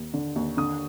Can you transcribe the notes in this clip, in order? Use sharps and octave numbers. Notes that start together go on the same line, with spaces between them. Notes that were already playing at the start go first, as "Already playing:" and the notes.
Already playing: D#2
D3
D#2
D3 D#6